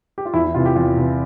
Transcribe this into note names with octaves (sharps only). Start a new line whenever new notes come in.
G4
F4
E2 E4
E4
C3 E3 F4
G4
E2 F4
C3 E3